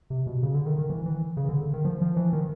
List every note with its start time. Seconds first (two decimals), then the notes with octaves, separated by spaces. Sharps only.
0.10 C3
0.27 B2
0.43 C#3
0.54 D3
0.66 D#3
0.78 D#3
0.90 E3
1.06 E3
1.37 C#3
1.49 D3
1.73 D#3
1.85 F3
2.02 F3
2.17 E3
2.33 D#3